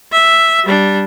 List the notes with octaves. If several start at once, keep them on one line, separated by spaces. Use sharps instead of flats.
E5
G3 D4